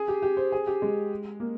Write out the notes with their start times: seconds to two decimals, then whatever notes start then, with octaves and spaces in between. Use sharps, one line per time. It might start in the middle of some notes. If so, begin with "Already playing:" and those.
Already playing: G#4
0.08 G4
0.22 G4
0.37 C5
0.52 G#4
0.67 G4
0.82 G#3
1.40 A#3